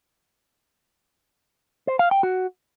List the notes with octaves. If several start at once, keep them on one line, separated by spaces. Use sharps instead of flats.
C5
F5
G5
F#4